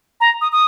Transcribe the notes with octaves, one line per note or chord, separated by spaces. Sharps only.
A#5
D#6
D#6